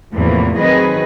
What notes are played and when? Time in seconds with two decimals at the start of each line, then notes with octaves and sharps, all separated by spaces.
0.13 E2 A2 C3 E3 F3 A#3
0.56 D#3 F#3 C4 G#4 B4 D#5